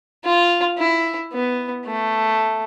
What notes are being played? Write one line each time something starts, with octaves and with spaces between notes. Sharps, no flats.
F4
E4
B3
A3